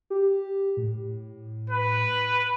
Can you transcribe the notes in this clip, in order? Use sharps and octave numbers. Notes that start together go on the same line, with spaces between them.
G4
A2
B4